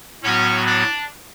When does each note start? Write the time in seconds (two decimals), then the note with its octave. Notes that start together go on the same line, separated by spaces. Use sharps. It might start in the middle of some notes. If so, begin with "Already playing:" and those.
0.23 A2 F#3 B3 C#4 F#4
0.66 D4